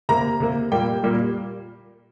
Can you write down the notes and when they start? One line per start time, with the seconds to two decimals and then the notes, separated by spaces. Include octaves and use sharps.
0.09 C3 A#3 A#5
0.40 C3 A#3
0.72 A#2 G3 A#3 G5
1.03 A#2 G3 A#3